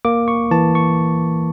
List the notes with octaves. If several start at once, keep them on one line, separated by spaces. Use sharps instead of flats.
A#3 D6
C#6
E3 A5
C#6